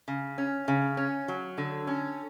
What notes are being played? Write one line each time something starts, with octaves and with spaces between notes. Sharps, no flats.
C#3
C#4
C#3
C#4
F#3
D3
C#4